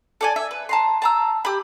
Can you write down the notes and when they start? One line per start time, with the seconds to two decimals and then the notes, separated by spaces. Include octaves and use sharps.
0.21 A4 D5 G#5
0.36 E5
0.51 B4
0.69 A5 A#5 C6
1.02 A5 A#5 E6
1.45 G4 B5